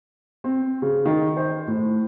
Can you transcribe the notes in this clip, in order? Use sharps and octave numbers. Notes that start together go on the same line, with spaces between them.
C4
C#3
D#3
C5
A2